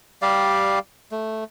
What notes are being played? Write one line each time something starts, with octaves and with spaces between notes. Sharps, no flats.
G3 G4 D5 F5
A3